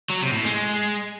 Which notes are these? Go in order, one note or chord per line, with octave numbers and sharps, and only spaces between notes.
F#3
C3
A2
G#3